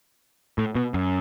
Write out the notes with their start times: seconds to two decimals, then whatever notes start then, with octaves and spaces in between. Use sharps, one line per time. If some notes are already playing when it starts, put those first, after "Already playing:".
0.58 A2
0.75 B2
0.94 F#2